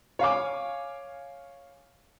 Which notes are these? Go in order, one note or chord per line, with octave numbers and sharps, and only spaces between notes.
C#5 F5 G#5 D6